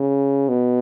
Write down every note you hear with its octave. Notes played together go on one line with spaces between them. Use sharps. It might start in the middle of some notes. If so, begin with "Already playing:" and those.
Already playing: C#3
B2